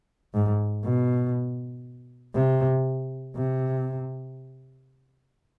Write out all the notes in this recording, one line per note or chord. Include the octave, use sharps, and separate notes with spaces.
G#2
B2
C3
C3